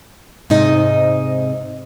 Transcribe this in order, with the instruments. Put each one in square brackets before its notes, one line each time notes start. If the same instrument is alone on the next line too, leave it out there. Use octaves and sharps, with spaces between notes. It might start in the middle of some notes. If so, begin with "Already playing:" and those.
[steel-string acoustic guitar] G#2 C3 D#4 D#5